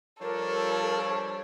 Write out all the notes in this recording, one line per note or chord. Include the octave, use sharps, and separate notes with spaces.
F3 G3 D4 A4 A#4 C#5